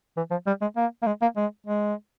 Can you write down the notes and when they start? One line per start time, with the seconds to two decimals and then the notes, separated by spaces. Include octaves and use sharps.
0.17 E3
0.31 F3
0.47 G3
0.62 G#3
0.77 A#3
1.03 A#3
1.07 G#3
1.22 A#3
1.37 G#3
1.67 G#3